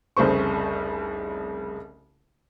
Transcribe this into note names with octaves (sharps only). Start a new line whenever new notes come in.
F1 C2 C#3 C5 C#6